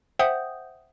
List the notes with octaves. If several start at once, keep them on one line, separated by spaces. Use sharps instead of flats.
C5 E5 F#5 G5 D#6 G6